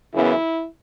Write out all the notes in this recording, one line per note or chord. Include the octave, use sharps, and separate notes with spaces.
F#2 C#3 E3 B3 E4